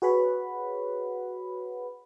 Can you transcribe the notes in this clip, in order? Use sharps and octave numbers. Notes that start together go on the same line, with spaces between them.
F#4 G#4 B4 C#5 F#5 B5